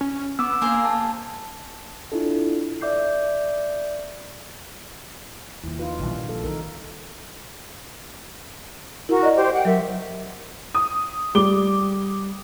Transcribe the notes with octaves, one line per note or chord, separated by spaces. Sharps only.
C#4
B3 D6 E6
A#3 G#4 A#4 C5
A5
D4 E4 F4 A4
D5 E5 D6 G6 C7
D#2 F3 A#3 E4
D#4 F4 B4
A#1 D3 D#3 G3
A4
D#3 F#3 C4 D#4 A#4
E4 F#4 A#4
D5 D#5
G4 C5
F#5 G5
F#3 A#4 E5
D#6
G3 D6 G7